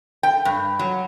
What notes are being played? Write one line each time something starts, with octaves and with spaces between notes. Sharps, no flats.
G5
G2
F#3